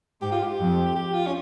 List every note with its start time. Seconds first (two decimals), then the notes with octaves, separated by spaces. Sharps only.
0.21 G#2 G4
0.32 F4
0.42 G4
0.59 F2
0.95 G4
1.13 F4
1.27 C#4